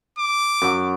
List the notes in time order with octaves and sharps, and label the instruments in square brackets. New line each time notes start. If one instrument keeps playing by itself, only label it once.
[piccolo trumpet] D6
[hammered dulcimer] F#2 F#3